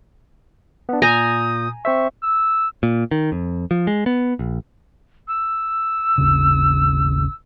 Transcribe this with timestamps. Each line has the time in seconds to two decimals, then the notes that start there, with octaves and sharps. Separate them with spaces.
0.89 B3 D4
1.02 A#2 G#5 A#5 D#6 G6
1.85 C4 C5 E5 C#6
2.23 E6
2.83 A#2
3.11 D#3
3.32 F2
3.71 F3
3.87 G#3
4.06 B3
4.39 A#1
5.27 E6
6.18 G#1 D#2 C#3